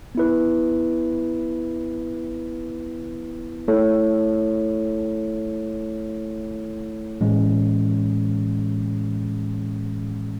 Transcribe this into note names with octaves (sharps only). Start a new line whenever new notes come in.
B3 E4 B4
A3 E4 A4 C#5
A2 E3 G#3 C#4